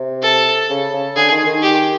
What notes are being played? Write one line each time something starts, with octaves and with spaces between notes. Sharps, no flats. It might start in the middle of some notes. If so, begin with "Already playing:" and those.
Already playing: C3
A4
C#3
C#3
D3 G#4
D#3
D#3
G4